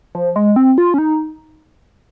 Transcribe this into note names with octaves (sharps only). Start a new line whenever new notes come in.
F3
G#3
C4
F4
C#4
D#4